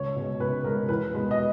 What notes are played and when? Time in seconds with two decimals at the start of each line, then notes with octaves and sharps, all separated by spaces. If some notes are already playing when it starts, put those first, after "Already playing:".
Already playing: C#2 C#5
0.16 B2 G#3
0.40 C#2 B4
0.64 B2 G#3 A#4
0.89 E2 B4
1.14 B2 G#3 B3
1.31 D#5